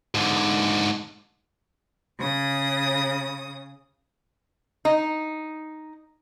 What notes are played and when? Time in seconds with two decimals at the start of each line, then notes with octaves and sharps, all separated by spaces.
0.15 G#2 D3
2.18 C#3 D#6
4.85 D#4